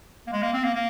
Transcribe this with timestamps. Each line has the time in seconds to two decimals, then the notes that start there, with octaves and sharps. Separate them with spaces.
0.27 A#3
0.32 G#3
0.42 A#3
0.53 C4
0.64 A#3
0.75 A#3